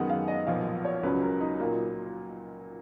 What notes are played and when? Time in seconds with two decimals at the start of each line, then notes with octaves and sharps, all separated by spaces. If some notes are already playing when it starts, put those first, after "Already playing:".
Already playing: F#2 D#3 G#3 B3 F#5
0.10 F5
0.28 D#5
0.47 B1 A#2 F3 B3 F5
0.85 C#5
1.03 C#2 C#3 F#3 C#4 B4
1.22 A#4
1.41 D#4
1.60 A#2 F#3 A#3 F4